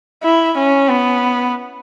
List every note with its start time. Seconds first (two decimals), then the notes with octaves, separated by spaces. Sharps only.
0.23 E4
0.57 C#4
0.90 B3